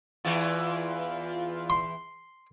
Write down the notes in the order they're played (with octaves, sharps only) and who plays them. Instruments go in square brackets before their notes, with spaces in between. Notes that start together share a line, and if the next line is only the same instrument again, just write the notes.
[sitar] E2 E3 [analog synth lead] F4
[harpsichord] C6